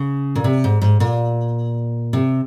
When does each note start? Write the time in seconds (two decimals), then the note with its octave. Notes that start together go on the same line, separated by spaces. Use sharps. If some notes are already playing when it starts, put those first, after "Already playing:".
Already playing: C#3
0.35 A#2
0.44 C3
0.64 G#2
0.82 G#2
1.00 A#2
2.13 C3